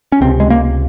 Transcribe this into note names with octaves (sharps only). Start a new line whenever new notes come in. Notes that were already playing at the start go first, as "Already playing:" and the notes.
C#4
C#2 C3 C4
G#3
A#3